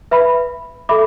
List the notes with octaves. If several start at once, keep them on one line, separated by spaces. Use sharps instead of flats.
B4 E5 B5
A4 E5 B5 D6